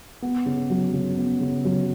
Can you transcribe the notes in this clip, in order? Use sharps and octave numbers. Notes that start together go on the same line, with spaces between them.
B3
C#3
F#3
C#3
B3
C#3
F#3